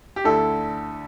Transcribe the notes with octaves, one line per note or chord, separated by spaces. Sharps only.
G4
D2 D3 A3 E4 A4